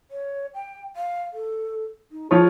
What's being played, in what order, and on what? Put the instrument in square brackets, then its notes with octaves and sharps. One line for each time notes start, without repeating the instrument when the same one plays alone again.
[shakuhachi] C#5
G5
F5
A4
D#4
[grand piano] F3 F4 C#5 [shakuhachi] G#4